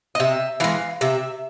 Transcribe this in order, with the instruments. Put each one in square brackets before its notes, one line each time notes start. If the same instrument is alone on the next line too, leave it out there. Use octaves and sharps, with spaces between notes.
[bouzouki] D#5
C3 E5
E3 G#3 F5
C3 E5